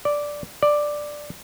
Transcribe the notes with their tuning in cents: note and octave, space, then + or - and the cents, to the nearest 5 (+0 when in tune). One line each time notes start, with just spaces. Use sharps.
D5 -5
D5 +5